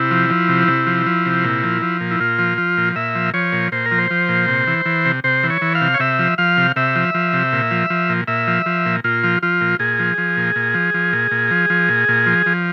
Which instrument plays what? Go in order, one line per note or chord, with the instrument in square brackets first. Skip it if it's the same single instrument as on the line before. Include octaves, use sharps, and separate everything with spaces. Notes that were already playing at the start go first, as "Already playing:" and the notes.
Already playing: [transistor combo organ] C3 E4
F3
F3
C3
C3
F3
F3
C3
A#2
F3
F3
A#2
E4
A#2 F4
F3
F3
A#2
A#2 E5
F3
F3 C#5
A#2
A#2 C5
A#4
F3
C5
F3
A#2
C3
E3
E3
C3
C3 C5
E3
C#5
E3
F5
C3
C#5
C3 E5
F3
F3 F5
C3
C3 E5
F3
F3
C3
A#2
F3
F3
A#2
A#2 E5
F3
F3
A#2
A#2 F4
F3
F3 F4
A#2
A#2 G#4
F3
F3
A#2
A#2
F3
F3
A#2
A#2
F3
F3
A#2
A#2
F3
F3